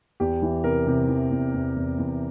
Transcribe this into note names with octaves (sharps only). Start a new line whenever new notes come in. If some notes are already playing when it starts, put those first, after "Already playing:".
E2 G4
E3
C3 A#4
C3
E3
E2
E2
E2
E2